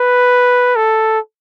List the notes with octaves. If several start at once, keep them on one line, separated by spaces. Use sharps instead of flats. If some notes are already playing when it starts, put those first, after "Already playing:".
Already playing: B4
A4